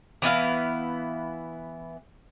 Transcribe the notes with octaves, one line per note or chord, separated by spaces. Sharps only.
E3 B3 E4 F5